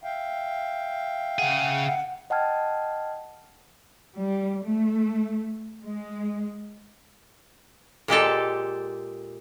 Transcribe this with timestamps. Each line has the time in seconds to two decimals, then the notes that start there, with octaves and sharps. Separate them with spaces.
0.03 E5 F5 G5
1.39 C#3 G#4 F#5
2.30 D#5 F#5 G5 A5 F6 G#6
4.16 G3
4.64 A3
5.82 G#3
8.08 A#2 G#3 G4 A4